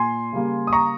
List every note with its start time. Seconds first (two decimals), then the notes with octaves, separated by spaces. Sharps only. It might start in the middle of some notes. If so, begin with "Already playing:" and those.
Already playing: A#2 G#5 C6
0.32 C#3 G3 A#3
0.67 D#6
0.72 A#5 C#6